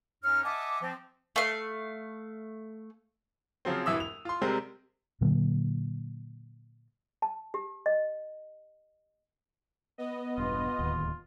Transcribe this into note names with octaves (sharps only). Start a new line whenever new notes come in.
F#2 C#4 D#4 C#5 F6
D#5 E5 F#5 G#5 A5 D6
F3 C4
A3 F5
C#3 F3 F#3 C4
E1 G2 E3 E5 D#6 E6
F7
F4 C6
C3 G3 G#3 C4 A#4
A#2 D3 F#3 A#3
A5
G4
D#5
B3 D#5
E1 G2 F4
D1 D#2